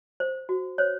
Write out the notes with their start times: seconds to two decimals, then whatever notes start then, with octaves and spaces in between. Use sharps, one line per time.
0.20 C5
0.49 F#4
0.78 C5 C#5